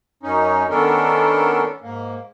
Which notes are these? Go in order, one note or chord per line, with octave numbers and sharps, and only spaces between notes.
F#2 C#4 D#4
D#3 B3 C#4 D4 A4 A#4
G#2 A#3